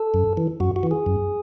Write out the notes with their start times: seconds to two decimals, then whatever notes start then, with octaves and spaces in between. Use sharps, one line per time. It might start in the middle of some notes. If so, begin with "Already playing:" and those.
Already playing: A4
0.14 F#2
0.37 E3
0.60 F#2 F#4
0.76 F#4
0.83 E3
0.91 G#4
1.06 F#2